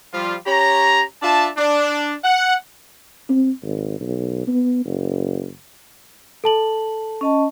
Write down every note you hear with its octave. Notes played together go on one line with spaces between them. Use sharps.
F3 G3 F4
C#4 G4 C#5 A#5
D4 F4 E5 A5
D4
F#5
C4
G#1
B1
B3
F#1
A4 A5 F#7
C#4 D#5 A5